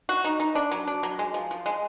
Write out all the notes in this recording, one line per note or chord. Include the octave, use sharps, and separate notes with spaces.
F#4
D#4
D#4
D4
F#3
D4
F#3
G#3
F3
F3
G#3